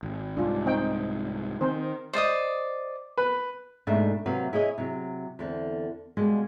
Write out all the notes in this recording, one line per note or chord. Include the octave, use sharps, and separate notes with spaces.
G#1
C2 G#2 D4 F4
C4 D#4 G5
D#3 C4 C5
C5 D5 D#5 D#6
B4
G#2 B2 A3 D4 E5
C3 F#3 A#3 F#4 B4
E4 G#4 C#5 D#5
C3 F#3
E2 D3 C4
B2 G3 G#3 A#3